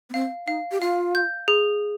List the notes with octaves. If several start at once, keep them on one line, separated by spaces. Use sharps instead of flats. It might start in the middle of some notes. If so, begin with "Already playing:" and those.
B3
C4 F5
D#4 F5
G4
F4 F5
G6
G#4